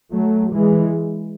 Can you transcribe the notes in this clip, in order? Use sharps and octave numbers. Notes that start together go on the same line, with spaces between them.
F#3 A3
E3 G#3